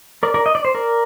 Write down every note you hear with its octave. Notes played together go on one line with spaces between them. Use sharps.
A#4 D5
A#4 D5
D#5
D5
C5
A#4 D5